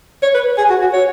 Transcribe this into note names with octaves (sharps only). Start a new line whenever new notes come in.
C#5
B4
G#4
F#4
F#4
C#5